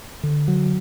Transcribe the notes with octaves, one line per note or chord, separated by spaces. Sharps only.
D3
F#3